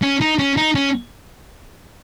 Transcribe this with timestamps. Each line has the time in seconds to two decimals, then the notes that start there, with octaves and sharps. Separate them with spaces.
0.03 C#4
0.21 D#4
0.39 C#4
0.57 D#4
0.75 C#4